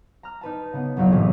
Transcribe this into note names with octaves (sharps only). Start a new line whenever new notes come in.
A#5 F6
D#4 B4 A5
C#3 B3
F#1 B1 F#3 F5
A2 C3 E3 G3 C#4 G#4